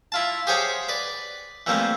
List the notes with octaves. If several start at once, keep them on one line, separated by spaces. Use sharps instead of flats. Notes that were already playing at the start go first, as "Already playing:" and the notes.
E4 F4 A5
G4 G#4 C5 C#5 F#5 G5
B4 D5
E3 G3 A3 A#3 C4